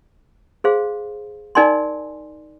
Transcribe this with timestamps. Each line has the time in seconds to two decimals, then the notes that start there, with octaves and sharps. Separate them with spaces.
0.64 G#4 C5 F5 C6
1.55 D#4 A#4 D5 G#5 C6